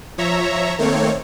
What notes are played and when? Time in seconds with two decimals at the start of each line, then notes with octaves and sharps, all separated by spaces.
0.18 F3 C#5 E5 A#5
0.79 D#3 A3 A#3 C4 C#5